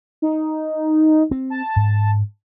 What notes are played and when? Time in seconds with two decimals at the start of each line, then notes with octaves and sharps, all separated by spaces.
0.22 D#4
1.31 C4
1.50 A5
1.76 G#2